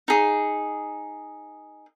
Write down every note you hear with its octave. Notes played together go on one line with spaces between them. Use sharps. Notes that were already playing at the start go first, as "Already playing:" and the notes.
D#4 G#4